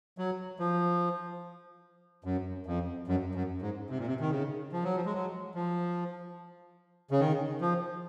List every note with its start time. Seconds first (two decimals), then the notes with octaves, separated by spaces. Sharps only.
0.18 F#3
0.59 F3
2.24 F#2
2.66 F2
3.07 F#2
3.35 F#2
3.62 G#2
3.90 C3
3.98 A#2
4.07 C3
4.20 D#3
4.31 C#3
4.72 F3
4.84 F#3
4.96 F3
5.06 G#3
5.13 F#3
5.54 F3
7.11 C#3
7.20 D#3
7.61 F3